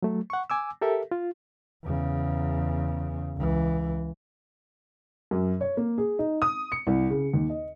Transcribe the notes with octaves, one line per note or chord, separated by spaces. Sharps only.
F#3 A3
F#5 C#6
G#5 D6 E6
G4 A4 A#4 E5
F4
E2 C#3
C#2 E3
F#2
C#5
A#3
G#4
D#4
D#6
C#7
C2
C#3
D#2
D#5